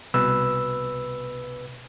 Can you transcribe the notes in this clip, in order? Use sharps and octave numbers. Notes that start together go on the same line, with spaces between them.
C2 B2 B4 E6